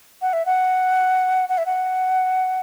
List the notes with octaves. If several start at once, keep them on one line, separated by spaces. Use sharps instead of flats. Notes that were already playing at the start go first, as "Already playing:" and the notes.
F#5
E5
F#5
F#5
E5
F#5